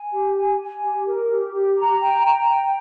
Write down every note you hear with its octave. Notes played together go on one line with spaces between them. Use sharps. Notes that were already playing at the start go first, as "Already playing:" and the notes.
Already playing: G#5
G4
G#5
G#5
G4
A#4
G4
G4
A#5
G5
A#5
G5